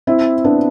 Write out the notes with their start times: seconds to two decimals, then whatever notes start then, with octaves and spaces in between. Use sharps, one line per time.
0.07 C4 E4
0.44 B3 D4